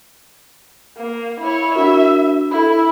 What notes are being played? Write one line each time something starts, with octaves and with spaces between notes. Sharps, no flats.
A#3
E4 C#5
D4 F#4 A#4 E5
E4 A4 B5